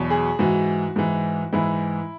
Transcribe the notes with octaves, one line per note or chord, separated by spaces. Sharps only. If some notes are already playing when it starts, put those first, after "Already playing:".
Already playing: E2 B2 F#3
G#4
G#2 E3 F#4
G#2 E3
G#2 E3 E4